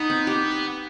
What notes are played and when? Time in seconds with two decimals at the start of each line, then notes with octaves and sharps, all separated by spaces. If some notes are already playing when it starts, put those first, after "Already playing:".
Already playing: B3 D#4
0.10 C4
0.27 G4